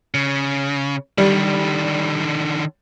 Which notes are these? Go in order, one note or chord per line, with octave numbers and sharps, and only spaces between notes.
C#3
D3 D#3 G3